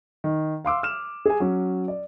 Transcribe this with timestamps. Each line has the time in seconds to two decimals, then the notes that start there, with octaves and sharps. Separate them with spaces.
0.24 D#3
0.65 F5 C6 D6 E6
0.83 F6 E7
1.26 G#4 G#5
1.40 F#3 C#4
1.88 D5